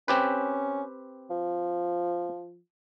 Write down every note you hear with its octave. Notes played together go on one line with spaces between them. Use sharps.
C4 C#4 G4 B4
F3